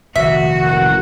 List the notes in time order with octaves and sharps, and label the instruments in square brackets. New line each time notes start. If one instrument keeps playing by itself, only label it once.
[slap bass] F1 A#2 D#3 [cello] F#4 [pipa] E5
[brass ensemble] A1 A#3 F#5